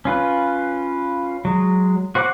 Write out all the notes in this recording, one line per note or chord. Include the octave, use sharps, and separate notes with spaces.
C#4 F4 B4
F#3 G#3
F#4 C5 F#5 A#5 D6